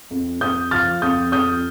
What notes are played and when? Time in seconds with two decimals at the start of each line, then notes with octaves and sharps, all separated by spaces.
0.11 F2
0.41 F2 D#6 G6
0.71 F3 F6 A6
1.02 F2 D#6 G6
1.32 F2 D#6 G6